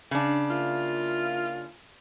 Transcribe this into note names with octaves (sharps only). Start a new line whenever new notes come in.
C#3 D4
A#3 E4 F4